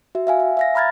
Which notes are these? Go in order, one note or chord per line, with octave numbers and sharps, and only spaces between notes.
F#4 E5
E5 F5 G#5
G#5
E5 F5 A#6
A#5 B5 F6 G#6 A6